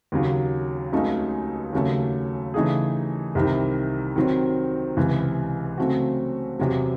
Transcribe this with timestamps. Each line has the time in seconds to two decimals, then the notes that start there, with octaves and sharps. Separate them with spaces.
0.12 D#2 C#3 F#3
0.93 C#2 C#3 F#3 A3 D#4
1.73 D#2 C#3 F#3 A3 C#4
2.54 C#3 E3 A3 D#4 G#4
3.35 C2 C3 D#3
4.16 D#3 F#3 C4
4.97 C#2 C3 E3
5.78 C#3 F#3 A3 C4 F#4
6.59 E2 C3 F#3